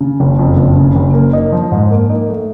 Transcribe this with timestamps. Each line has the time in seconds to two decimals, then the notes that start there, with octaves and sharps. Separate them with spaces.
0.01 C#3
0.20 F#1
0.39 F2
0.57 F#1
0.76 C#3
0.96 F#1
1.14 A#3
1.33 D#4
1.52 F3
1.72 G#2
1.91 A#3
2.10 D#4
2.29 A3